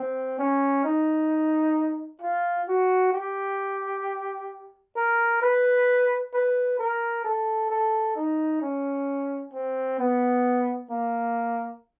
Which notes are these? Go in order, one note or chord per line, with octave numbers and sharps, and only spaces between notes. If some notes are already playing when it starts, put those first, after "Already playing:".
Already playing: C4
C#4
D#4
F4
F#4
G4
A#4
B4
B4
A#4
A4
A4
D#4
C#4
C4
B3
A#3